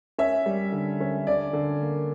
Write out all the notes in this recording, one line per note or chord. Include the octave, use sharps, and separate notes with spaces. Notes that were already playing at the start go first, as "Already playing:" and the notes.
C#4 E5
G3
D3
C#4
D3 D5
D3
A#3